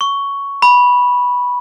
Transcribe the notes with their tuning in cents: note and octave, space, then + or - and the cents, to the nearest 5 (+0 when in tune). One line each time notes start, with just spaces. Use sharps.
C#6 +10
B5 -10